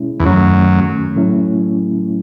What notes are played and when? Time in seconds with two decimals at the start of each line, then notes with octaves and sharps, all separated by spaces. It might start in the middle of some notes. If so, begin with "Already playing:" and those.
Already playing: B2 G#3 C#4 E4
0.20 E2
0.25 F#2 D#3 A3 C#4
1.16 A2 F#3 A3 C#4 E4